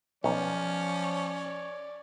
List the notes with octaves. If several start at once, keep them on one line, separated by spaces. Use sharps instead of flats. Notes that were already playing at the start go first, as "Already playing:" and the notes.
B1 F3 C#4 C#5 D5